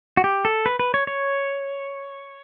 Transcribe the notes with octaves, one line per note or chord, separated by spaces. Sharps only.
F#4
G4
A4
B4
B4
C#5
C#5